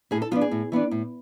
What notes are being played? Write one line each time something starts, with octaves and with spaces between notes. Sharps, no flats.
A2 G#4
A4
F3 B3 D4 F4
G#4
A2
E3 B3 D4
A2